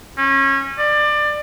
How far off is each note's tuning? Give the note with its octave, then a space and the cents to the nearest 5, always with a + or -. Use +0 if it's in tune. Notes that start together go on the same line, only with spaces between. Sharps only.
C#4 -25
D5 +25